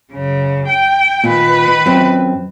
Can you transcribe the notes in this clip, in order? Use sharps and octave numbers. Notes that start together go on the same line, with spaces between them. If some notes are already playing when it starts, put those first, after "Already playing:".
F#2 C#3
G5
A#2 D#3 B4
F#2 C4